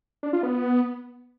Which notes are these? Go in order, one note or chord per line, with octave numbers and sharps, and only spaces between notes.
D4
F4
B3